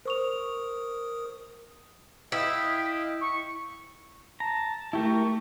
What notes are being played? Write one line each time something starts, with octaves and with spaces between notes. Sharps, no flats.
A#4 C5 C#6 D#6 F7
E4 D#5 F5 G5 B6
C#6
A5 A#5
A3 E4 G4 A#4 C#6